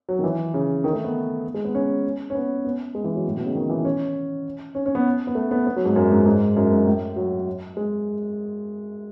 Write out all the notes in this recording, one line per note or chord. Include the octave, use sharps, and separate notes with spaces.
F#3
D#3
E3
C#3
D#3
A3
B3
G#3
B3
C#4
C#4
B3
B3
G#3
E3
F#3
A2
B2
C#3
D#3
E3
C#4
C#4
C#4
B3
B3
A3
B3
B3
F#3
G#2
F#2
G#2
G#2
F#2
G#2
A2
F#3
G#3